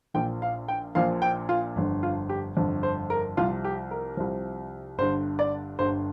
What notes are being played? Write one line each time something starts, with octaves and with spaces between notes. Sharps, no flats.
A#1 A#2 F3 G5
F5
G5
A#1 A#2 F3 F5
G5
F4
G1 F2 D3
F4
G4
G1 F2 D3
C5
A#4
C2 C3 F3 F4
G4
A#4
C2 C3 F3
G1 G2 D3 C5
D5
G1 G2 D3 C5